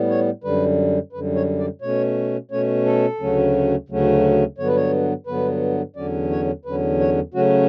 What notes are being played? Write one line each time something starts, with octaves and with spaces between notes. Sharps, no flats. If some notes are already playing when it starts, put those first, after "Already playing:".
Already playing: A2 G3 B3
C#5
F#2 D3 G3 B4
F#2 D3 G3 B4
C#5
D5
B2 A3 C#4 C#5
B2 A3 C#4 C#5
A4
D2 C#3 F#3 A3 C#4
D2 C#3 F#3 A3 C#4
G2 D3 F#3 B3 C#5
B4
C#5
G2 D3 F#3 B3 B4
E2 D3 F#3 C#4 D5
C#5
E2 D3 F#3 C#4 B4
C#5
C#3 F#3 A3 C#4 F#4